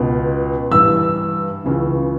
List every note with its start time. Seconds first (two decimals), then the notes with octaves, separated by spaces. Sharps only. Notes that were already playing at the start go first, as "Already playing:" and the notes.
Already playing: C#2 B2
0.71 G2 E3 E6
1.65 C#2 C#3 E3